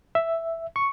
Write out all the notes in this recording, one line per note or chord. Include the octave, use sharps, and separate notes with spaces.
E5
C#6